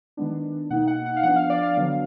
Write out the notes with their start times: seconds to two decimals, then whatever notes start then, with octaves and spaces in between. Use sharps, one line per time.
0.17 D#3 G#3 B3 D4
0.70 B2 A#3 D#4 F#5
0.87 F#5
1.06 F#5
1.17 F5
1.23 F3 B3 D4 F#5
1.36 F5
1.50 D5
1.63 F5
1.76 D3 F#3 B3 D4